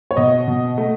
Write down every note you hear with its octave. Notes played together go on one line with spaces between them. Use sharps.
C#5
B2 D#5
B2
A3